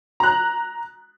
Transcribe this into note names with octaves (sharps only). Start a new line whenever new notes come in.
A#5 F#6